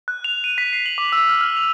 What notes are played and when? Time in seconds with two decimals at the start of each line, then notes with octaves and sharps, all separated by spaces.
0.08 F#6
0.24 F7
0.44 D#7
0.58 B6
0.73 C7
0.86 F#7
0.98 D6
1.12 E6
1.29 F6
1.41 F6
1.57 F7